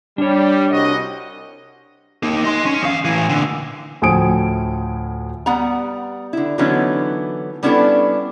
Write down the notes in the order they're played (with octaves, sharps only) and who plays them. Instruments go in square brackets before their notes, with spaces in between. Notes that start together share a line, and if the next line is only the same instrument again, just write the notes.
[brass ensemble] G3 [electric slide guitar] D4 C#5
[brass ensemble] C2 F#4 D#5
[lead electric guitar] A#3 D#4
D#5 C6
C#4
E2 F5
A2 E3
A#2 D3
[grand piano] D2 A2 F3 G#5 D#6 D7
[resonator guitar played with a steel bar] G3 B3 F#5 A#5
D3 E4
D3 E3 F#3 B3 C#4 D#4
G3 B3 C#4 D4 E4 A4